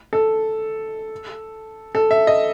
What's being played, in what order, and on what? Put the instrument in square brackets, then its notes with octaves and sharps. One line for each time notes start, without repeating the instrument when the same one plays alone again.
[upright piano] A4
A4
E5
D#5